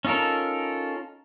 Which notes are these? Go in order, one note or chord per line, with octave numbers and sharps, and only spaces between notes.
C#4 D#4 F4 A4 A#4